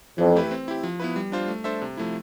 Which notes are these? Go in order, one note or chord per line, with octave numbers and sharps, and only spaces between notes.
F2 E3
A3 E4 G4 B4
C4
E4 G4
F3
B3 E4 B4
G3
D4 F4 C5
A3
D4 A4 C5 E5
C3
F3 A3 E4